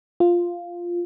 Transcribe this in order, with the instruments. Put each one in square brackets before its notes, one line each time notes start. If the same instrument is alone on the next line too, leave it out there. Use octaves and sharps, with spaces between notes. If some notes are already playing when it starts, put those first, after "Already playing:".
[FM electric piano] F4